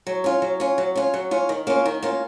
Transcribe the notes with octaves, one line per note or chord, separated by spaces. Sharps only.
F#3
C#4 F4
F#3
C#4 F4
F#3
C#4 F4
F#3
C#4 F4
D#3
A#3 C#4 F4
D#3
A#3 C#4 F4